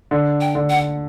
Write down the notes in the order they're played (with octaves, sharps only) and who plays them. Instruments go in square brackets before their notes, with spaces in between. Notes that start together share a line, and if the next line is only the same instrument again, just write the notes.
[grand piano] D3
[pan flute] G5
[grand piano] D3
[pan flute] F#5